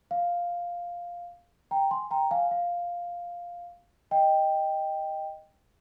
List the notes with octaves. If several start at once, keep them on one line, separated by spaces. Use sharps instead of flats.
F5
G5 A#5
G#5 C6
G5 A#5
F5 G#5
F5
D#5 G5